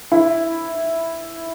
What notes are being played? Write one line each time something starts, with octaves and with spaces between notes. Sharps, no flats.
E4